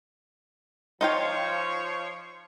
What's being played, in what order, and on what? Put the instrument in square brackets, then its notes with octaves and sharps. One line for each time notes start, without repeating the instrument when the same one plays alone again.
[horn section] F3 C#5 [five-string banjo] D#4 F4 G5